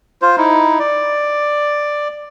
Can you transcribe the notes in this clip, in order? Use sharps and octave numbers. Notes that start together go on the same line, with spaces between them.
F4 C5
D#4 E4
D5